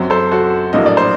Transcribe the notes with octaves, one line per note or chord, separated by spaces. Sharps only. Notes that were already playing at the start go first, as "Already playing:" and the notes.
Already playing: F#2 F#3 C4
A4 C5
F#4 A4
A#1 A2 F#3 A#3 D#5
D5
C5